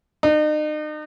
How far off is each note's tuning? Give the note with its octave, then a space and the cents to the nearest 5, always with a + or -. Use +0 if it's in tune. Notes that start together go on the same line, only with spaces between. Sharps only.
D#4 -40